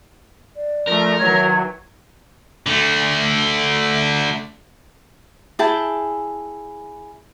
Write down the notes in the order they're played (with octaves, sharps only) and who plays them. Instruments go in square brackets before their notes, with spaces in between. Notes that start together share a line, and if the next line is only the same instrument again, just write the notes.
[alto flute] D5
[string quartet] F3 A3 [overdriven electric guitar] A#4
[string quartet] D#3 E3 F#3 [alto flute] C#5 [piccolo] G#6
[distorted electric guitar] D3 A3
[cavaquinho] E4 G#4 G5 A5